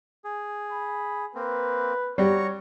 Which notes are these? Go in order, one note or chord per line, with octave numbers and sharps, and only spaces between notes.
G#4
B5
A#3 C4 B4
G3 F#4 C#5 A#5 C#6